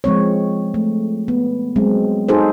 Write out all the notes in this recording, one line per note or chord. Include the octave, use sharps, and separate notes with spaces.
F3 G#3 C4 C#5
A3
B3
F#3 G#3 C4
D#4 F#4 G#4 A4 C5